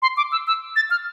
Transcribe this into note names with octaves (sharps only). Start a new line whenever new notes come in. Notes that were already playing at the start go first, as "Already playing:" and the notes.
C6
D6
E6
E6
A6
F6